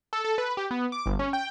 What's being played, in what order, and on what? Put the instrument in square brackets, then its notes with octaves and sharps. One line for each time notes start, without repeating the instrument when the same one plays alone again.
[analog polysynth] A4
A4
B4
G4
B3
D6
G1
C#4
G5